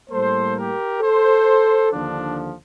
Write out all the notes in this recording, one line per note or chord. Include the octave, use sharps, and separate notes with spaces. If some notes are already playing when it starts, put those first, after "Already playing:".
A2 G3 A#3 A4 C5
G4 A#4
A4 C5
D#2 D3 F3 D4